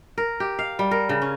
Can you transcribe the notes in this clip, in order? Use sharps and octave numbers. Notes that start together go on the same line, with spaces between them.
A#4
G4
F5
G3
A#4
C#3
C#4